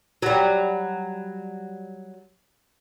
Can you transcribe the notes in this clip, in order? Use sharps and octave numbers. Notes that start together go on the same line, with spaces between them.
F#3 G3